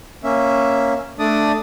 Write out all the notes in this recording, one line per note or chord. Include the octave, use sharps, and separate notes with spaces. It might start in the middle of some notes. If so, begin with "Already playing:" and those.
A#3 C#4 E5
A3 D4 D5 D#6